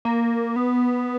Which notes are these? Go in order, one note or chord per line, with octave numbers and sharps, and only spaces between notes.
A#3
B3